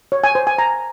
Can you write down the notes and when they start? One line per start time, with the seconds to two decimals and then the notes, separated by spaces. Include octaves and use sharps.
0.12 C#5
0.24 G#5
0.35 C5
0.47 G#5
0.58 A#5